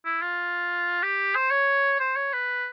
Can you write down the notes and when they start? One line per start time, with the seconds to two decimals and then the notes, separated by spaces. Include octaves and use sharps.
0.05 E4
0.22 F4
1.03 G4
1.35 C5
1.51 C#5
2.00 C5
2.16 C#5
2.33 B4